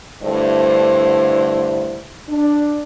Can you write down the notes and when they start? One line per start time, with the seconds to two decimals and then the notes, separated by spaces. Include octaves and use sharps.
0.23 G2 D3 A3 E4 C5
2.29 D4